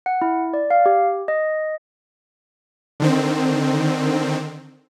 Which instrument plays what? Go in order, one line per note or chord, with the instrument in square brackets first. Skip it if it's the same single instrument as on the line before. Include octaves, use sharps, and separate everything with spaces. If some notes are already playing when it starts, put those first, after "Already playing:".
[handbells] F#5
E4
D5
F5
G4
D#5
[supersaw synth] D3 D#3 C4